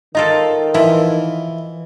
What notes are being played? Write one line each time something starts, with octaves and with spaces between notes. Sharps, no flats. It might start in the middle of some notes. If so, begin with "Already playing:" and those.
D#3 D#4 F4 A4 D#5
E3 F3 E4